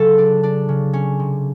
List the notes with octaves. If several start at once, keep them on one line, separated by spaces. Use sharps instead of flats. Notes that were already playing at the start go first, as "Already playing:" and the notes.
Already playing: C#3 F#3 A4
D4
D4
C#3
C#4
C3